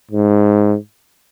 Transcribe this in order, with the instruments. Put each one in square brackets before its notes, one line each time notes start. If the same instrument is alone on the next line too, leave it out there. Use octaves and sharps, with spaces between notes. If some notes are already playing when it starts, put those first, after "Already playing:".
[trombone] G#2